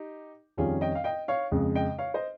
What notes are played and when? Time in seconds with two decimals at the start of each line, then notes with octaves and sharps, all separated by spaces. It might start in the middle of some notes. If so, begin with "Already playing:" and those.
Already playing: D#4 G4
0.57 F2 D#3 G3 C#4 F4 G#4
0.81 D#5 G5
0.95 F5
1.04 D#5 G5
1.28 C#5 F5
1.52 F2 C#3 G#3
1.75 D#5 G5
1.98 C#5 F5
2.14 C5 D#5